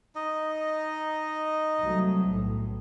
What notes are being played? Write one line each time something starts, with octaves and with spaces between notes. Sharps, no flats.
D#4 D#5
C2 F#3 A3
B1 A2